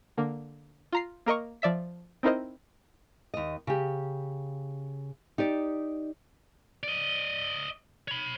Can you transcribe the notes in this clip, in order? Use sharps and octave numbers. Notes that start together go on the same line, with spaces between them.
D3 A#3
F4 A#5 C7
A#3 A#4 D#5 C#6
F3 D5 E5 B6
C4 D#4 E4 A#4 C5 D#5
D#2 D#5
C#3 G4
D#4 G4 D5
D5 D#5
C#5 B5